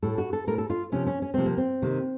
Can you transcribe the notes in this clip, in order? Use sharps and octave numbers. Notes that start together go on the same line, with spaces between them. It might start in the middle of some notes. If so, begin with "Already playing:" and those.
A2 A3 A4
F#4
A4
A2 A3 A#4
A4
F4
C3 F3 A#3 C#4
C#4
C#4
C3 F3 A#3 C4
A#3
C4
C3 D#3 A#3